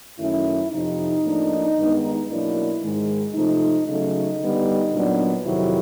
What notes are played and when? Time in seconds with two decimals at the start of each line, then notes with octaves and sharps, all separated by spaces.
0.19 F#2 D#3 F#3 A3 C#4 E4
0.72 F2 C3 F3 D#4
1.24 A2 F3 A#3 D4
1.77 G2 D#3 G#3 B3 D4
2.29 B2 F#3 A#3 D4 E4
2.82 G#2 D#3 G#3
3.35 C3 F3 A3 D#4
3.87 C#3 F#3 A3 D#4
4.40 D3 G3 B3
4.92 A#2 F#3 B3 D4
5.45 F2 C3 D#3 F#3 E4